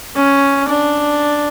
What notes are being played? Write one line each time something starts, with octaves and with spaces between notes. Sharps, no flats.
C#4
D4